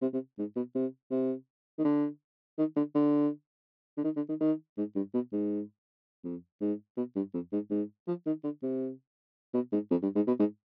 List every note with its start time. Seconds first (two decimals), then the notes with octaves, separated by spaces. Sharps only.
0.02 C3
0.13 C3
0.38 G#2
0.56 B2
0.75 C3
1.11 C3
1.78 D#3
1.84 D3
2.58 D#3
2.76 D3
2.95 D3
3.97 D3
4.04 D#3
4.16 D3
4.29 D#3
4.41 D#3
4.78 G#2
4.96 G2
5.14 B2
5.32 G#2
6.24 F2
6.61 G#2
6.97 B2
7.16 G2
7.34 F2
7.53 G#2
7.70 G#2
8.07 F3
8.26 D#3
8.44 D3
8.63 C3
9.54 B2
9.73 G#2
9.91 F2
10.03 G2
10.15 G#2
10.27 B2
10.39 G#2